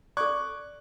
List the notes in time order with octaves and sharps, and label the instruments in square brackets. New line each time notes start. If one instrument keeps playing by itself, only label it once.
[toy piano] A4 D5 [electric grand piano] C#6 D6 F#6